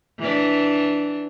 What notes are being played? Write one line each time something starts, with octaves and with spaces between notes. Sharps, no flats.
E3 D4